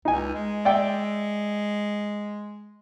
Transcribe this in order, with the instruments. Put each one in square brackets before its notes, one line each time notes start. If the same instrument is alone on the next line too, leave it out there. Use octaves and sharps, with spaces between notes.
[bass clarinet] C#2 [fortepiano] D#4 G#5
[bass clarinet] G#3
[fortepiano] D5 E5 G5